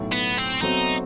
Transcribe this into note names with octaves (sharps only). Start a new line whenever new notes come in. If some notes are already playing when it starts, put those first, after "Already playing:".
Already playing: B1 A2 F#3
B3
C4
B2 F#3 A3 C4 D#4 F#4